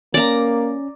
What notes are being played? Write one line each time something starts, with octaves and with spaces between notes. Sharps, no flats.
A#3 C#4 D5 A#5